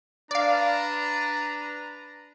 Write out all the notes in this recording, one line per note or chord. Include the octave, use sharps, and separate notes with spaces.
D4 B4 D5 F5 A#5